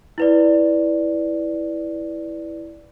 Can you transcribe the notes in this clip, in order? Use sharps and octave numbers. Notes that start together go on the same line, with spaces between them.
E4 B4 D5